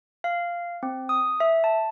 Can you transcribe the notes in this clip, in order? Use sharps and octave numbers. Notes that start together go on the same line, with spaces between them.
F5
C4
D#6
E5
A5